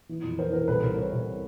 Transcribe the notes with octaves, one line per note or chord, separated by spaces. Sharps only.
E3
F2
E3 A#4 C5
E3 A#4 C5
C2 A4 B4
C2 A#4 C5
C2 B4 C#5
C2